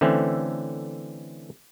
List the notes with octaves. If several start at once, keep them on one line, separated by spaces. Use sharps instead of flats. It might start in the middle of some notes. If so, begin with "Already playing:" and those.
D3 E3 A3 C4 C#4